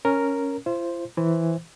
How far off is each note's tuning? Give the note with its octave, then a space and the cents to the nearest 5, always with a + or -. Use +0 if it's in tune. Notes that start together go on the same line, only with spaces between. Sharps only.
C#4 +0 A#4 +0
F4 -45 C5 +0
E3 +0 C5 +0